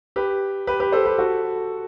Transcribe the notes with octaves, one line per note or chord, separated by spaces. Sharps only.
G4 B4
G4 B4
G4 B4
A4 C5
G4 B4
F#4 A4